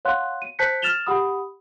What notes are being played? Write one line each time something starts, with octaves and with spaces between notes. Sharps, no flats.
C#5 F5 F#5 C6 F#6
D#7
C5 A5 F#6 G6 B6 C#7
F6 A6 E7 F7 G7
G4 F#5 B5 D#6